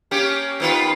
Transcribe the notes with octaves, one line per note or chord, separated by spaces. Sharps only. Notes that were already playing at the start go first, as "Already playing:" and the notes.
A#3 C#4 G4
D#3 B3 F4